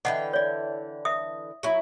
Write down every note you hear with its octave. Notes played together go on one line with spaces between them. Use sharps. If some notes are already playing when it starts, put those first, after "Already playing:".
D3 E3 D#5 F#5 G5
C#5 D5
E5 D#6
F#3 E4